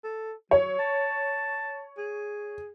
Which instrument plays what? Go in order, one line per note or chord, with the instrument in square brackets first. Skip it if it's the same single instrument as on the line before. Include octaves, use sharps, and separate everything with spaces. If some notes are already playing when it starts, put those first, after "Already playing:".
[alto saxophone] A4
[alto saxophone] F#3 [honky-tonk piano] C#5
[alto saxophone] A5
G#4